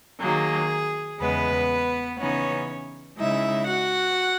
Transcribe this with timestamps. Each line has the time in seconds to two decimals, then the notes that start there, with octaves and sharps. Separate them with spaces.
0.20 D#3 F#3 A#3 G#4
1.20 E2 C#3 G#3 B3 B4
2.18 C#3 E3 B3 C#4 D#4 C#5
3.18 C#3 G#3 D#4 E4 E5
3.67 F#4 F#5